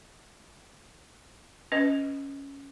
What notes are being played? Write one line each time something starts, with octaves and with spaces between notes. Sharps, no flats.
C#4 B4 D#5